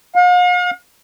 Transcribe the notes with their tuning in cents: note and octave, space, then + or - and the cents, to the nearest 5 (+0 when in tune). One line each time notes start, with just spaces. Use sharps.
F5 +45